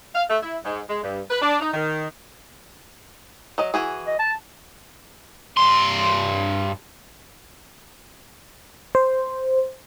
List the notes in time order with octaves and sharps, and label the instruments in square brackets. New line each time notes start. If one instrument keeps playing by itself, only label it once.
[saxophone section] F5
A3
E4
G#2
G#3
G2
B4
D4
D#4
D#3
[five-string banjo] F#3 D#5
E3 F#4 G#4
[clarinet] D#5
A5
[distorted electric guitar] G2 C6
[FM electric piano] C5